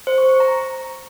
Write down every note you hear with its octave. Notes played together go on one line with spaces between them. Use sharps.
C5
C#6
C#6
A#5